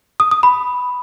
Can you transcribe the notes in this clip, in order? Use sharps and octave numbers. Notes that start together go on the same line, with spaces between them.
D#6
D#6
B5